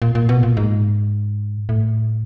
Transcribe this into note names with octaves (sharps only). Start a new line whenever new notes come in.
A#2
A#2
B2
A#2
G#2
A2